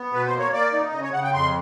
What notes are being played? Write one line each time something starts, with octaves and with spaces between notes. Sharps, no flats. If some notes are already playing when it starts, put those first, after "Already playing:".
Already playing: B3
B2 B4
C5
A#3
C#5
A#3 D5
D#4
C#3 D#5
C#5
C#3 F#5
G5
F2 C6